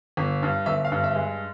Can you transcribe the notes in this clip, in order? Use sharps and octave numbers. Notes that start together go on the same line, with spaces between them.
G1
G2
G1 E5
F5
G2
E5
G#3